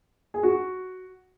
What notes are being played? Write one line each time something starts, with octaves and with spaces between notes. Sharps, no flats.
G#4
F#4